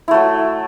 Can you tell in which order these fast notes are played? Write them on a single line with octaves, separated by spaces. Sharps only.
E4 A3 F#3